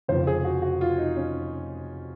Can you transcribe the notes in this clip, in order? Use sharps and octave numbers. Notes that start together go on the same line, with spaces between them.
F1 F2 C#3 F3 C5
G#4
F#4
F#4
F4
D#4
C#4